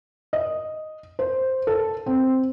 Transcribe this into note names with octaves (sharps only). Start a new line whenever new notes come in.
D#5
C5
A4
C4